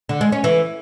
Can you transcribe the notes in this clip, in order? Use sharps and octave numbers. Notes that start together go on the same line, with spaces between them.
D3
G#3
C#4
E3